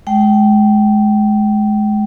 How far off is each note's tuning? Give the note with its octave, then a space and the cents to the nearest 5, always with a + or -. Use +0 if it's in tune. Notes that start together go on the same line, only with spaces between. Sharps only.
G#3 +25 G5 -25